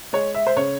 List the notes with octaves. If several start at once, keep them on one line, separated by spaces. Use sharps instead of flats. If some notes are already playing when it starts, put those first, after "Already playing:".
G#3 C#5
E5
C5
C#3 C#5